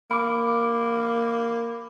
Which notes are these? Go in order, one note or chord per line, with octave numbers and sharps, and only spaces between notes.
A#3 B5 D6